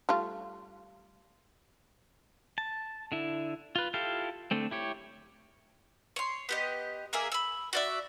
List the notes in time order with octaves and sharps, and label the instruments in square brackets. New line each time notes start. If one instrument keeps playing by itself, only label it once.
[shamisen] G3 A3 F4
[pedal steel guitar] A5
D3 E4
F4 B4
E4 F4 G4 A4 F5
D3 A3 C4
E4 G4 C#5
[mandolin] C#5 C6
B3 G4 D#5
A#3 G#4 A#4 E5
B5 E6
F#4 D5 E5